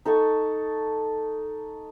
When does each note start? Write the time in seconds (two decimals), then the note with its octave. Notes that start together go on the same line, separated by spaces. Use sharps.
0.05 D#4 A4 A5 C#6